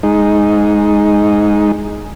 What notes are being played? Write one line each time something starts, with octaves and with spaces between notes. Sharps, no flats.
G#3 D#4